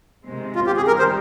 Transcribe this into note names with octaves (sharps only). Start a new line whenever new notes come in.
C3 D#3 G#3 C4
F4
G4
G#4
C3 D#3 G3 C4 G4 A#4
C5